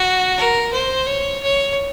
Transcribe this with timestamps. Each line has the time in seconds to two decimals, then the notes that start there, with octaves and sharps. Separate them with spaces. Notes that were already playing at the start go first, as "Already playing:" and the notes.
Already playing: F#4
0.37 A#4
0.73 C5
1.07 C#5
1.43 C#5